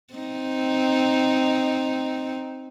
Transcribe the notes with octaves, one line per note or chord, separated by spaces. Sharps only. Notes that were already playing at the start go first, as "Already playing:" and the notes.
C4 D#4